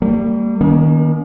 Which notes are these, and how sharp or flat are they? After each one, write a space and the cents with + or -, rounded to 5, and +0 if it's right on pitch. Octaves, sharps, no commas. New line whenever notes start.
G3 +0 A#3 -40
D#3 +0 A#3 +45 C#4 +35